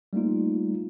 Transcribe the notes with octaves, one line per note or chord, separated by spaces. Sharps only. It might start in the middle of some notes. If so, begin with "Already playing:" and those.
G3 A3 A#3 D#4 F4